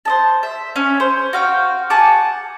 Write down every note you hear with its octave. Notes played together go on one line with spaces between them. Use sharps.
C5 D#5 A5
E5
C#4
C5
F#4 F5 G5
F#5 G#5 A5 D6